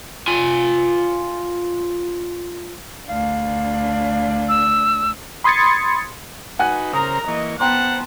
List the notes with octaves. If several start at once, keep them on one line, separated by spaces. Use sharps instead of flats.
F4 G#5
D2 D4 F5
E6
B5 C6 D#6 G#6 A6 C#7
D#4 F#4 B4 F#5 G#5 F#6
C#3 A#4 C5 A#5 D#6
E3 A#3 D#5 C#6
B3 C5 F#5 G5 A5 A#5 C6